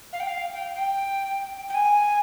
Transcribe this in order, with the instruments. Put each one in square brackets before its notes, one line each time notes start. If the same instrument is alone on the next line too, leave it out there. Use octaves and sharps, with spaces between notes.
[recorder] F5
G5
F5
G5
G5
G5
G#5